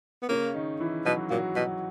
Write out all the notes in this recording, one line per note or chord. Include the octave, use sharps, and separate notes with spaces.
B3
C#3 A#3 C#4
D#3 D#4
E3 E4
B2 F#3 F#4
A#2 F#3 F#4
B2 F#3 F#4